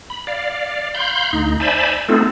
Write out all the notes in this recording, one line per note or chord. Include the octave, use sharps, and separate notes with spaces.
B5
D5 F5
F5 B5 C6 G6
D2 D#4
C5 D5 E5 G#5 A5 B5
A3 B3 C4 D#4 F4 A4